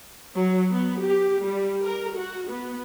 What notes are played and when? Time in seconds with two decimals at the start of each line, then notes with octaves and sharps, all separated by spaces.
0.36 F#3
0.72 B3
1.01 G4
1.44 G3
1.83 A#4
2.15 F#4
2.48 B3